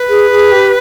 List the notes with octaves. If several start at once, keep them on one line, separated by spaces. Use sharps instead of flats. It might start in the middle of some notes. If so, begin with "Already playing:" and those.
Already playing: B4
G#4
G#4
G4